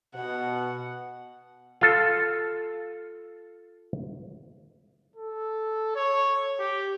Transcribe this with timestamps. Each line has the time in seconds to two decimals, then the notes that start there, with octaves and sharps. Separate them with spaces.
0.15 B2 F#5
1.81 F4 A4
5.16 A4
5.95 C#5
6.59 G4